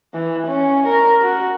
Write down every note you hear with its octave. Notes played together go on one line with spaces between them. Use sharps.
E3
C#4
A#4
F#4